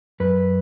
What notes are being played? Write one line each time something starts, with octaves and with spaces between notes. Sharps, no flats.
F#2 B4